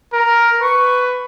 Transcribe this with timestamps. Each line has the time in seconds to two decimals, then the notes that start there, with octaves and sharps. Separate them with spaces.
0.13 A#4
0.62 B4 C#6